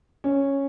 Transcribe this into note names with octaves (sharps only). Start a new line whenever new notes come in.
C#4